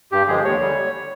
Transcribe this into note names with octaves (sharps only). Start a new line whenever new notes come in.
G2 G4
D3 F3 G#3 G#4
D#2 C#5
D3 G3